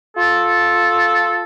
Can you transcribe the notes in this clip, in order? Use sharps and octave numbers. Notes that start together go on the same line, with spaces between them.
F4 A4